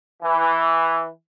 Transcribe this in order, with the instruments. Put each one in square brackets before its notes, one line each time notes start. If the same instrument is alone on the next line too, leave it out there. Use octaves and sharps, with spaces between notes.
[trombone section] E3